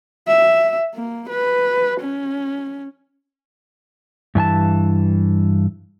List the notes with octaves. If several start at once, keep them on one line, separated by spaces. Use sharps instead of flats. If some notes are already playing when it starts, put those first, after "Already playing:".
E5
A#3
B4
C#4
G2 E3 G#5 A5